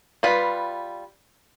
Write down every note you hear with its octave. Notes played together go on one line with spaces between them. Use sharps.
G3 F4 B4